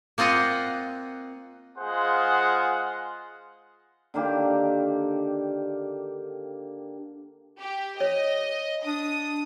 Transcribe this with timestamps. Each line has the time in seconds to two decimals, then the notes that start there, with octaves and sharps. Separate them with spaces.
0.18 A#3 C4 F4 D#5 F#5
1.78 G#3 F4 G#4 C5 F5 F#5
4.14 D3 D#3 A#3 G4
7.61 G4
8.00 C#5 D#5
8.85 D4 D#6